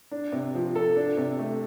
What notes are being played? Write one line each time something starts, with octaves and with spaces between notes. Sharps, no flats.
D4
C3
F3
A4
D4
C3
A3